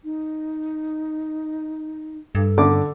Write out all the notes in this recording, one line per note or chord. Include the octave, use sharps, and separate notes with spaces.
D#4
G2 A4
D3 D6